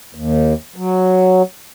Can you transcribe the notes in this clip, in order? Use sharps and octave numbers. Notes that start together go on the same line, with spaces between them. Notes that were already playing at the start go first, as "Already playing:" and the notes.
D#2
F#3